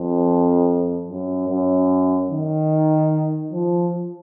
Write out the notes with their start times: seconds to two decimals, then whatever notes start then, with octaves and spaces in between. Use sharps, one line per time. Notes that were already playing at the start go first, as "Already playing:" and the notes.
Already playing: F2
1.08 F#2
1.49 F#2
2.31 D#3
3.53 F3